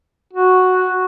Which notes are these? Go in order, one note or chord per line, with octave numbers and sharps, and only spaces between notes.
F#4